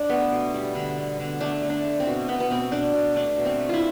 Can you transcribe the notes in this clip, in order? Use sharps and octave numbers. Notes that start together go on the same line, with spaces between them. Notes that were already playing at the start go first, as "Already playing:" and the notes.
Already playing: D4
A3 B3
B2
G3
D3
B3
D3
A3 D4
A3
D4
A3
C4
B2
B2 B3
B3
B2 C4
B2 D4
B2
A3 D4
B2
C4
A3
E4 F4